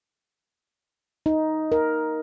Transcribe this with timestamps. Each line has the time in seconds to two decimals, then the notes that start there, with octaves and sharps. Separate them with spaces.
1.26 D#4
1.72 A#4